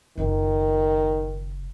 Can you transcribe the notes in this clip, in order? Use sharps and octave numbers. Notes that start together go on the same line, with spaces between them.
F#1 D#3 F4